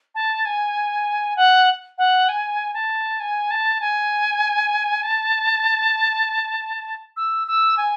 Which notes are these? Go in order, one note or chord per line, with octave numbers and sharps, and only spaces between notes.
A5
G#5
F#5
F#5
G#5
A5
G#5
A5
G#5
A5
E6
E6
G#5